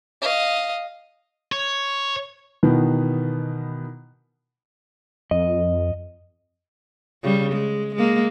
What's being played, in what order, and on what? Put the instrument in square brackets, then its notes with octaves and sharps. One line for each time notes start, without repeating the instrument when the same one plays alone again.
[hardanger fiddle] D#5 F5
[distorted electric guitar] C#5
[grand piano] B2 D#3 E3 B3 D#4
[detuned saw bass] F2 [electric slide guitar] D#5
[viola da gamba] C#3 G3
G#3
G#3 A#3